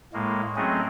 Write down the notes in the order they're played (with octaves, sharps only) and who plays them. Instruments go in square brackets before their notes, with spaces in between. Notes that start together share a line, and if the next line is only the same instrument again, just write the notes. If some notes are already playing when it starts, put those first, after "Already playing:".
[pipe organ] A2 G#3 A#3
F#3 A3 C4 C#4 G#4 D#5